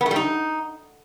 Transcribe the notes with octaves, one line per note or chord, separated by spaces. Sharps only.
B3
A3
G3
D#4